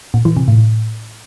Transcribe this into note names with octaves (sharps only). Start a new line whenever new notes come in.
A#2
E3
C3
A2